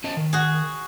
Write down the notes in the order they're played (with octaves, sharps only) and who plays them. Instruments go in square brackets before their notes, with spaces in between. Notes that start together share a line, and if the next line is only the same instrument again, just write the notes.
[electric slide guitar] C#4 D#5 A5
D#3
[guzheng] F#4 G#4